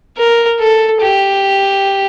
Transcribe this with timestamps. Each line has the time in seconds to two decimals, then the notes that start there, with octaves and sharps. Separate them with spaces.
0.18 A#4
0.60 A4
1.02 G4